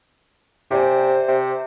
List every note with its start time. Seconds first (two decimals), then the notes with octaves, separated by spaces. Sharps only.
0.71 C3 G4 C5 D5 G#5
1.28 C3